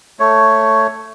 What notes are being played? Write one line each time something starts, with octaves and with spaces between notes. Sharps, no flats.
A3 C#5